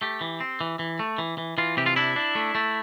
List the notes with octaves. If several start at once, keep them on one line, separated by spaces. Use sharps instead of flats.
A3 G4
E3
C4
E3
E3
A3
E3
E3
E3 F4
C3 G4
F4
D4 E4
D4
A3
A3